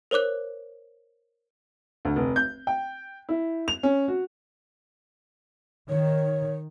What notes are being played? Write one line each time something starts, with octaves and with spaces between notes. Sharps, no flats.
A#4 C5 C#5 D6 F#6
D2
F1
G6
G5
E4
F7
C#4
F#4
D#3 C#5